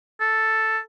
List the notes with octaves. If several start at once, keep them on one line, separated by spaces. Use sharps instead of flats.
A4